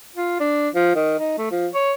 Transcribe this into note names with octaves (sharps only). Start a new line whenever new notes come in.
F4
D4
F3
D#3
D#4
A3
F3
C#5